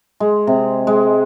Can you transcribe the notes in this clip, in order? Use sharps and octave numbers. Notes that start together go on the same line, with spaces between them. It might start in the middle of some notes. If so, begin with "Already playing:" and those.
G#3
C3
G#3